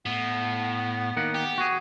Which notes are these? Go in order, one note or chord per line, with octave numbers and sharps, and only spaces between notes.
A2 B3
D#3 A#3 B3 F#5
G4
F#4 G#4